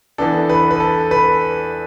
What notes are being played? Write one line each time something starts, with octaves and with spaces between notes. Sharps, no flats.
E2 E3 B3 D4 A4
B4
B4
A4
B4